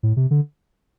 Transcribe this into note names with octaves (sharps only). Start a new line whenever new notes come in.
A2
C3
D3